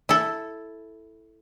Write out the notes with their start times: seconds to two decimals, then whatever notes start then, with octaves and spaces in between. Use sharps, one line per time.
0.09 E4 A4